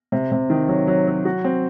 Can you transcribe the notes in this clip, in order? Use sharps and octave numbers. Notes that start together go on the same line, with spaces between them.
C3
C3
D#3
F#3
F#3
F#3
F#4
C4